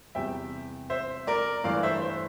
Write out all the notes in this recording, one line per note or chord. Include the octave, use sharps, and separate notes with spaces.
E2 C3 G3 E5 G5
C5 E5
A#4 D5
G2 E3 A3 D5 F5
C5 E5
C5